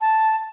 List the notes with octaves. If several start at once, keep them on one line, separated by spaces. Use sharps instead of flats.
A5